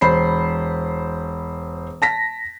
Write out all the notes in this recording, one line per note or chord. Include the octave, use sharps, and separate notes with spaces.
E1 C5 B5 C7
A5 A#6 B6